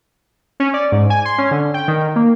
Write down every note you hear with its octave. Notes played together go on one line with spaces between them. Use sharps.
C#4
D5
G#2
G#5
C6
C#4
D3
G5
D#3
A#3